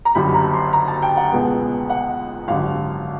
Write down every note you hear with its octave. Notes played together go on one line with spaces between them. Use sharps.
A#5
F#1 F#2 D3 G3 B5
A#5
C6
A#5
A5
G5
F#5
C#2 B2 G#3 B3
F#5
G#1 F#2 D3 G3 F5